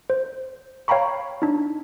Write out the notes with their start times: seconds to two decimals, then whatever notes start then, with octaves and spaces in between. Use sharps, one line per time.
0.10 C5
0.88 C#5 F5 G5 A#5 B5 C#6
1.42 D4 D#4